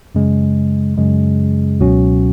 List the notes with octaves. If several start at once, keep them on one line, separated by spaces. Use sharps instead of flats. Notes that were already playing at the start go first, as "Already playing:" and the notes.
F#2 C#3 G#3
F#2 C#3 G#3
C#2 B2 F#3 C#4 F#4